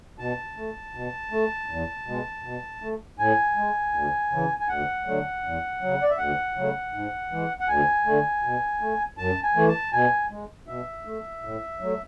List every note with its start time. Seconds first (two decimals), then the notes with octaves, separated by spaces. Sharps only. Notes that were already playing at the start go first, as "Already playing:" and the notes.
0.19 B2 A5
0.57 A3
0.94 B2
1.31 A3
1.69 E2
2.06 B2 G#3
2.44 B2
2.81 A3
3.19 A2 G#5
3.56 G#3
3.94 D2
4.31 C#3 E3
4.60 G#5
4.68 D2 F#5
5.06 D3 F#3 A3
5.43 E2
5.81 C#3 F#3
6.02 D5
6.10 E5
6.18 D2 F#5
6.56 C#3 F#3 A3
6.93 G#2
7.31 E3 G#3
7.60 F#5
7.68 D2 G#5
8.06 D3 A3
8.43 B2
8.80 A3
9.17 F#2 A5
9.43 G#5
9.55 E3 A3
9.68 A5
9.92 B2 G#5
10.31 G#3
10.67 B2 E5
11.05 A3
11.43 A2
11.80 F#3 A3